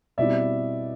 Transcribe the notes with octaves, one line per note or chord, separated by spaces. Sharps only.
B2 G3 C4 E4 D5 E5